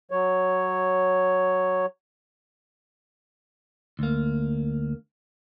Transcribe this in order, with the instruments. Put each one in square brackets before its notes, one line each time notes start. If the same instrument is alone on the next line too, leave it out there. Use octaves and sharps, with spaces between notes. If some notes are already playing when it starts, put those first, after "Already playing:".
[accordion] F#3 C#5
[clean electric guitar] D2 A#3